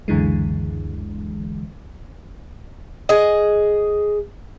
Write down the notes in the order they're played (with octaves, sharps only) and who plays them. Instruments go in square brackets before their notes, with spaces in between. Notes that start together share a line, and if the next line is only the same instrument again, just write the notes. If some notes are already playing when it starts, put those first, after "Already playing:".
[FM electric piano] C#2 F#2 D3 E3 G#3
[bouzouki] G#4 D#5